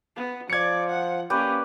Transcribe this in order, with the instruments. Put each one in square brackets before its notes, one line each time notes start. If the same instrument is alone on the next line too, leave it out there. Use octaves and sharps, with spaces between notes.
[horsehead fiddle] B3
[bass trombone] F3 [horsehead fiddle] D5 [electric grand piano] G#6 C#7
[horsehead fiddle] F#5
[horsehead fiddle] A#3 C#4 [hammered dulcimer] G4 B4 D5